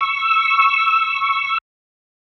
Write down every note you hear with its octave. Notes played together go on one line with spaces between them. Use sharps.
C#6 E6